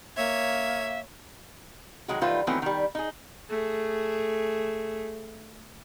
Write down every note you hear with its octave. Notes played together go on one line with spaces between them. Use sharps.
A#3 C#5 E5 G#6
D#3 F#3 G#3 F#4
D#3 F#3 G3 A3 F4 B4
D#3 E3 F#3 A3 B3 C4
D#3 G3
D#4 G#4
A3 G#4